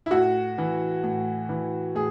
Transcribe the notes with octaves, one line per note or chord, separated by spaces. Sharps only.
E4
A2 F#4
E3
A2
E3
A2 G#4